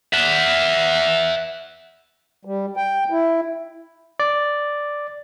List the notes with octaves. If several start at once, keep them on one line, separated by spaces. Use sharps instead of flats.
E5 F#5
G3
G5
E4
D5